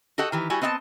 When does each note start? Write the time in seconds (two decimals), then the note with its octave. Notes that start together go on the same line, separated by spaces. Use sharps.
0.18 F#4 G4 A4 D#5 F#5
0.32 D#3 E3 G4
0.50 G3 E4 F#4 G#5
0.61 B3 C4 D#5 F5 A5